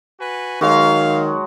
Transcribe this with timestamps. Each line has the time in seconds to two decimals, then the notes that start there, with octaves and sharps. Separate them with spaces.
0.18 F#4 B4 G#5
0.61 D#3 F#3 G#3 F#4 F5